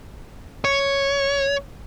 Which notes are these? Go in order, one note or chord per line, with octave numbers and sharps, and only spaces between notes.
C#5